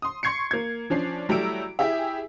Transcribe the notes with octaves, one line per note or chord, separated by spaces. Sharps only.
C6 D#6
C6 C#6 G#6 C7 C#7
A#3 G#6
F3 C#4 D4 C7
F#3 G3 A3 E4 E6 D7
E4 G4 G#4 E5